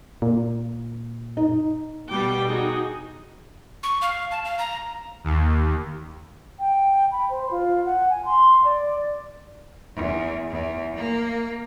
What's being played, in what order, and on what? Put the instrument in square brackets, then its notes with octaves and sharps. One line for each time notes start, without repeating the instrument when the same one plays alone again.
[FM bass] A#2
[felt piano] D#4
[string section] B2 G3 [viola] G5 D6
[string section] D#4 [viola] F#4 G#4
[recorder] C#6
F5
A5
F5
A#5
[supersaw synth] D#2
[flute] G5
B5
C5
F4
F#5
G#5
C6
D5
[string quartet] E2
E2
A#3